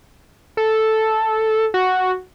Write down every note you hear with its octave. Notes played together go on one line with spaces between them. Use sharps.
A4
F#4